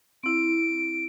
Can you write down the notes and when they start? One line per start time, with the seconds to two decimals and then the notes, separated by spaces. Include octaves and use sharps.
0.24 C4 E4 D7